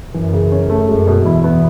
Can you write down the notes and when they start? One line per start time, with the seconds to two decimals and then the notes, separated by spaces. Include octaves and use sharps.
0.14 F#2 E3
0.33 C#3
0.52 C#4
0.70 A3
0.88 F#2 G#3
1.07 B2
1.26 E2 E4
1.44 B3